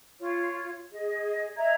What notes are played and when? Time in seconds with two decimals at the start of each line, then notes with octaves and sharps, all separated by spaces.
0.19 F4 C#5
0.92 G#4 D#5
1.56 D#5 E5 A#5 G#6